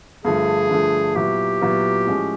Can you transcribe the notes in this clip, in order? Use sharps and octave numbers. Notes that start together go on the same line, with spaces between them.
G2 D3 F3 A3 G#4
G2 D3 F3 A3
A#2 F#3 B3 E4 G4
A#2 F#3 B3 E4
A2 F3 G#3 C#4